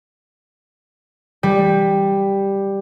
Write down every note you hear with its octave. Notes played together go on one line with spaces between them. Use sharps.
G3